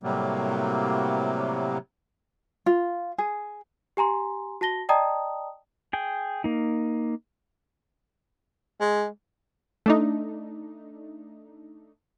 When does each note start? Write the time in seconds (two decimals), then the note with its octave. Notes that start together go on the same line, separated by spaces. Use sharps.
0.03 A2 C3 F#3 G3 A#3
2.66 F4
3.18 G#4
3.97 G4 G#5 A#5 C6
4.61 F#4 A5 A#6 G7
4.89 D5 D#5 G5 A5 A#5 D#6
5.93 G#4 G5
6.44 A#3 D#4
8.80 G#3
9.86 A3 D4 D#4